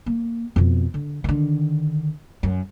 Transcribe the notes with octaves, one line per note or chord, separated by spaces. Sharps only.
A#3
F2 B2
D3
D3 D#3
F#2